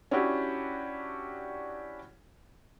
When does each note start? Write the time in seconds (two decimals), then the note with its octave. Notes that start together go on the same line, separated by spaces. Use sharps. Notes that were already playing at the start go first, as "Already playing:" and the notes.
0.11 C#4 D4 E4 F#4 G4